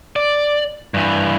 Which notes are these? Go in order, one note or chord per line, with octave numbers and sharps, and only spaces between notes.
D5
G2 E3